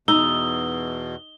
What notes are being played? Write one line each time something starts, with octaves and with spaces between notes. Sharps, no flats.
E2 B2 D#4 E6 G7